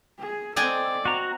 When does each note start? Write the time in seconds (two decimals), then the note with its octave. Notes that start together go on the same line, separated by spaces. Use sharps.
0.20 G#4
0.56 C4 A4 D5 D#5 G5 G#5
1.05 C4 F#4 A#5